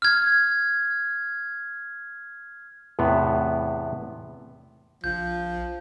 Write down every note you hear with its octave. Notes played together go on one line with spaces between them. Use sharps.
F6 G#6
E2 A2 C3 B3
A#1 F3 G6